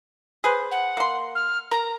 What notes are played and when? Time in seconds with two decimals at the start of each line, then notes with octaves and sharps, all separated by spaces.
0.44 G#4 B4 C5
0.71 F#5
0.97 A#3 C6
1.35 F6
1.71 A#4 A#5